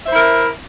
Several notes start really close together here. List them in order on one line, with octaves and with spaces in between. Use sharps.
E5 C5 E4 A#4